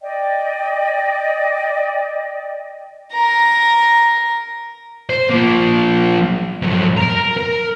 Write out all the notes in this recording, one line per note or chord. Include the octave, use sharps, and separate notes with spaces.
D5 D#5 G5
A#4 A#5
C5
F3 A#3
F2 F#3
A#4 A#5
A#4